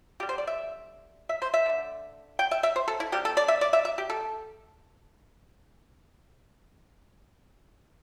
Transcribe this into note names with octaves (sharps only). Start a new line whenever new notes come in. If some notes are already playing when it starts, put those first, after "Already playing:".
D3 G3 G4
C5
D5
E5
E5
C5
E5
D3 A3
G5
E5
E5
C5
A4
E4
C3 G3 G4
A4
D5
E5
D5
E5
E5
G4
A4